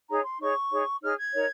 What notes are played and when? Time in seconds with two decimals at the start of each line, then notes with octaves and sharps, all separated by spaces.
0.09 D#4 G#4 C#5 A#5
0.24 C6
0.40 D#4 G#4 C#5 C#6
0.71 D#4 G#4 C#5
1.02 D#4 G#4 C#5 F6
1.17 G#6
1.34 D#4 A#4 C#5